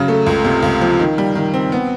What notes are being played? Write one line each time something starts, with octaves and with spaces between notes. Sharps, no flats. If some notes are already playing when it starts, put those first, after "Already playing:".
Already playing: C#3 F#3 C#4
A3
C#2
C3
C#2
F3
D#3
G3
D#3
C4
B3